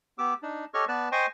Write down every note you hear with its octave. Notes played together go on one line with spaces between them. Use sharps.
B3 G4 D6 E6
D4 D#4
G4 A4 C#5 D#5 C#6 F6
B3 B4 D5 A5
C5 D#5 G5 G#5 C6 C#6